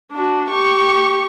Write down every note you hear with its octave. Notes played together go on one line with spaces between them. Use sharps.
D4 F#4
G4 C#6